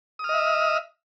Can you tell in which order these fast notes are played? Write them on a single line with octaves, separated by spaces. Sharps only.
D#6 F6 D#5 E5